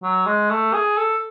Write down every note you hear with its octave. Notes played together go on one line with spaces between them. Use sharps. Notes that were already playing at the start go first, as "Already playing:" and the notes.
F#3
G#3
A3
G#4
A4